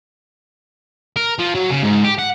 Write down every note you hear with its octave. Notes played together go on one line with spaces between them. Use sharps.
A#4
F3
F#3
C#3
G#2
G4
F#5